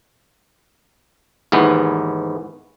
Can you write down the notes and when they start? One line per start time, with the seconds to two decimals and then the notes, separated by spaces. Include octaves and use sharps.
1.52 D#2 G#2 E3 B3